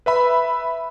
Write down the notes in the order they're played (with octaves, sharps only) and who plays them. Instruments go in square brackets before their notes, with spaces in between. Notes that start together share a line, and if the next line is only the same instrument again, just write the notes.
[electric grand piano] B4 E5 B5